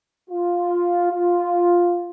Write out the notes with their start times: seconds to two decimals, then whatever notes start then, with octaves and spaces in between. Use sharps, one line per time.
0.30 F4
1.12 F4